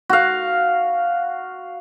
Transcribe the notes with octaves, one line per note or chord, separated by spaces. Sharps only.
F#4 F5